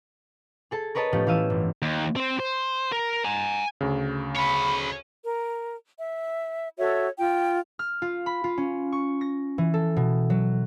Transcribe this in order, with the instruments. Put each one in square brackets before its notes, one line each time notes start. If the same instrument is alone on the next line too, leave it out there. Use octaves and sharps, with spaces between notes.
[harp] G#4 A4 A5
A#4 B4 C#5 D#5 A5
A2 F3 A3 B3 C#4 G4
E3 E4 F5 E6 D#7
G1
[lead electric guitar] D#2
C4 C5
C5
A#4
G#5 A#5
[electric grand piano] D2 C#3
[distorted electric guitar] B4 C#5 [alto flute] B5
[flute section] A#4
E5
F#4 A4 C#5 E5
F4 G5
[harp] F6
F4
B5
F4
C#4
C#6
A#6
E3
A4
B2
F#3